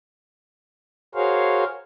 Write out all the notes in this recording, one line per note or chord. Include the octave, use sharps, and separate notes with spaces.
F#4 G#4 A#4 C5 C#5 F5